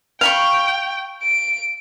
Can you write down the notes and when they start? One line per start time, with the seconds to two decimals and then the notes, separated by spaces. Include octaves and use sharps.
0.21 F5 G5 B5 C#6
1.23 D7